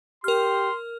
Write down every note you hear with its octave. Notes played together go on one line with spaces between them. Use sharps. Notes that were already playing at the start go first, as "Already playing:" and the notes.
G4 A#4 C6 F6